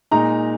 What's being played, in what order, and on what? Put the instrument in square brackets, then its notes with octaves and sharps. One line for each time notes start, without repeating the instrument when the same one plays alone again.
[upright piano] A#2 G#3 D#4 A#5